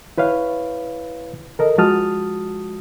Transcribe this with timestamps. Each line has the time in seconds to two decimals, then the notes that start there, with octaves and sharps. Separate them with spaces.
0.18 E4 B4 C#5 F5
1.59 A4 A#4 D#5
1.78 F3 G#3 F#4 A5 D#6 F6